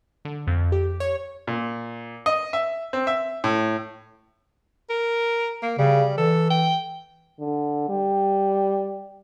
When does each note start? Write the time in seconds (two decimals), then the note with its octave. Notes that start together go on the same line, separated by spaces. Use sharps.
0.25 D3
0.47 F2
0.72 G4
1.00 C#5
1.47 A#2
2.26 D#5
2.53 E5
2.93 C4
3.07 E5
3.44 A2
4.90 A#4
5.62 A#3
5.78 C#3 G3
6.18 E3 A4
6.50 G5
7.40 D3
7.89 G3